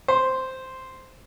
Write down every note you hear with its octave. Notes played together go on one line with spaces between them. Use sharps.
C5